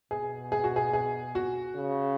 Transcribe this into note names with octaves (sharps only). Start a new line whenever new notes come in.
B2 G#4
G#4
F#4
G#4
G#4
F#4
C#3